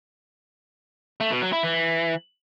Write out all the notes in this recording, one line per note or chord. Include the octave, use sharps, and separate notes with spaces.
A3
B2
F#3
E4
E3